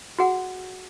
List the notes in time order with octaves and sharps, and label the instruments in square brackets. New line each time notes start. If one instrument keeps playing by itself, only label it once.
[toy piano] F#4 G#4 F#5